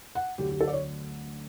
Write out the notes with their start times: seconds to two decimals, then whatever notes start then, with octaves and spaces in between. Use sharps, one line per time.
0.15 F#5
0.38 D2 D3 F#3 G4
0.50 G4
0.61 A4
0.68 D5
0.73 C#5